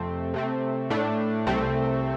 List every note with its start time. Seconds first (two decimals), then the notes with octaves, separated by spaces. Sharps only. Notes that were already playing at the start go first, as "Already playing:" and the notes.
Already playing: F2 C3 A3 C4
0.34 C3 A3 C4
0.90 A2 A3 D4
1.47 C2 C3 A3 C4